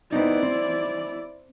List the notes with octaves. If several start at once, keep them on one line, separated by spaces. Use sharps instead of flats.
B3 C4 D#4 E4 D5
C4